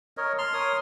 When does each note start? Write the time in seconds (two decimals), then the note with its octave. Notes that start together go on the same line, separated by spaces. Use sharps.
0.17 A#4 C#5 D#5
0.38 A5 C6 F6
0.53 A#4 C#5 D#6